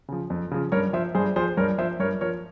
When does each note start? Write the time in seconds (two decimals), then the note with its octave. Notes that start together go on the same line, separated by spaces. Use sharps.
0.08 C#3 F3
0.30 F2
0.51 C#3 F3
0.72 G2 A#4 C#5
0.93 F3 C5 E5
1.15 G2 G#4 C5
1.36 F3 G#4 C5
1.57 G2 A#4 C#5
1.78 F3 C5 E5
2.00 G2 A#4 C#5
2.21 F3 A#4 C#5